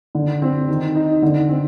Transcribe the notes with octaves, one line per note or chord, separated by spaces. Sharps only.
D3
C4
D#3
D#4
D3
C4